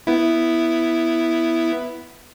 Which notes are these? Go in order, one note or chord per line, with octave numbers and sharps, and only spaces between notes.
B3 E4